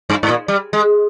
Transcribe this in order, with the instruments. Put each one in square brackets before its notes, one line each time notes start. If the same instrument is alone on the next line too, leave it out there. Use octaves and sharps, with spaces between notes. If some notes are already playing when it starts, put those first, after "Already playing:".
[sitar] G2
G#2
A#2
G3
G#3